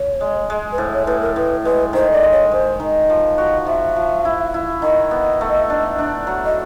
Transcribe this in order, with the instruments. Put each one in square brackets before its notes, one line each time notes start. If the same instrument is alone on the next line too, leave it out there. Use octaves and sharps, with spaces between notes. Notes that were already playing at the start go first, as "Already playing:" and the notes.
Already playing: [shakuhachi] C#5
[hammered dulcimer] G#3
G#3
[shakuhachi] B4
[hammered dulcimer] A2 [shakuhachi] C5
[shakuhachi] C#5
[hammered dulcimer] A2 [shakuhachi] B4
[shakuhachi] A#4
[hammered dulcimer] A2 [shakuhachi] B4
[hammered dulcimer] G#3 [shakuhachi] B4
[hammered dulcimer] D#3 [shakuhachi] C5
[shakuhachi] D5
[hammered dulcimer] G#3
[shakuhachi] C#5
[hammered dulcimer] G#3 [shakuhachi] C5
[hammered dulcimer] D#3
F3
[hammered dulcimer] F#4 [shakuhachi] D#5
[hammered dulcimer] F3 [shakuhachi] E5
[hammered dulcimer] F3
E4
E4
[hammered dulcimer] D#3 [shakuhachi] D#5
[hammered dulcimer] B3
A3
D4
D4
F#3
[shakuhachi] D#5